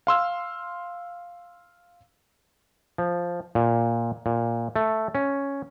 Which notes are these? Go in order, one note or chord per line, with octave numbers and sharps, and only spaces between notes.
F5 C6 E6 F6
F3
A#2
A#2
A3
C#4